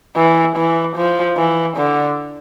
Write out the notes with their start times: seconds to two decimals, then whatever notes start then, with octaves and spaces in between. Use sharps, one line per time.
0.16 E3
0.56 E3
0.96 F3
1.37 E3
1.77 D3